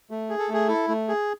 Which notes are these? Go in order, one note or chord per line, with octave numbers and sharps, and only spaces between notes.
A3
G#4
A4
A3 G#4
E4 A4
A3
G#4